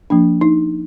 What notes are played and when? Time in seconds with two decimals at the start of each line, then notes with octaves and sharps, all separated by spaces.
0.10 F3 A#3 D4
0.41 D#4